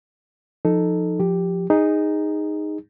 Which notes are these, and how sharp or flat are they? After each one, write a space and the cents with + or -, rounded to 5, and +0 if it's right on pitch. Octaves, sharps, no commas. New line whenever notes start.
F3 +0 D#4 -5 A4 +0
F3 +10 G4 +0
D#4 +0 G#4 -20